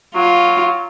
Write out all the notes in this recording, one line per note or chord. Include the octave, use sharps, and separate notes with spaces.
F#3 F4